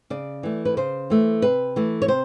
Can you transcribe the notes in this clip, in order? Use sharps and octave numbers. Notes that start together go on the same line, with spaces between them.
C#3 D5
E3 A3
B4
C#3 C5
E3 A3
C3 B4
E3 A3
C#5
C3 C5